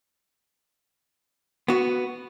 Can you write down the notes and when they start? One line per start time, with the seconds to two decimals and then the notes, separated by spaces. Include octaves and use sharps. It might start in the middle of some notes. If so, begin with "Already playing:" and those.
1.68 B3 F#4